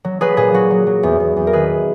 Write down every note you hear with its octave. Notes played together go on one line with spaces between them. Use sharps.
F#3
F#3 G#4 B4
A#2 G#4
F#3 F#4
F#3
F#3
E2
E2
E2
A#4
D#3 G#4 B4